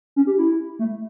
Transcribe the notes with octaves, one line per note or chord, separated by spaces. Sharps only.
C#4
G4
E4
A3